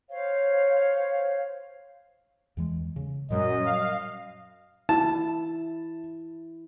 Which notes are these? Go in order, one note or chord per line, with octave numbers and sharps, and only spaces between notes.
C5 C#5 F5
E2 E3 G#3
C#3
F#2 A#2 F#3 G3 D#5
F5
E4 A5